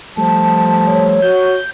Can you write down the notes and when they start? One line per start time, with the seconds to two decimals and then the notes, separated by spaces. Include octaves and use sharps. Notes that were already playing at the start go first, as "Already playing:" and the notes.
0.17 F3 G3 A3 A5
0.87 C#5
1.22 F#4 G6